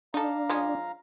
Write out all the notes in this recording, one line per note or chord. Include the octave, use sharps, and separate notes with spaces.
D4 D#4 A4 F5 A#5
F3 G#3 C#4